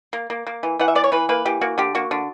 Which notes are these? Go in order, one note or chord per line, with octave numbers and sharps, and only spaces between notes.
A#3
A#3
A#3
E3
E3 F#5
E5
B3 D5
C#5
E3 B4
A#3 B4
E3 G4
A#3 F#4
D3 G4
A#3 F#4
D3